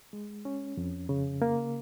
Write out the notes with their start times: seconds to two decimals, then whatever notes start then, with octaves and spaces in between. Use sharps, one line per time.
0.13 G#3
0.45 C#4
0.77 F2
1.09 C#3
1.42 A#3